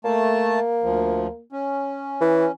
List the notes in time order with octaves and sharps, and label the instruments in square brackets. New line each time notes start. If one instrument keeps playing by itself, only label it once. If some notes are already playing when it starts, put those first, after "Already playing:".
[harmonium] A3 A5 [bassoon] A#3
[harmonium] D2 F3
C#4
[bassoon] E3